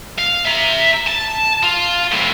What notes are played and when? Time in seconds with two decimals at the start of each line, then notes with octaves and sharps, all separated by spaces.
0.18 F5
0.45 E5 A#5
1.07 A5
1.63 F4
2.12 C2 A2